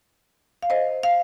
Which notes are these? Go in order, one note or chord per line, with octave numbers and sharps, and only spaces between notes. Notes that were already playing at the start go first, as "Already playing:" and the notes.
F5
C5 D#5
F5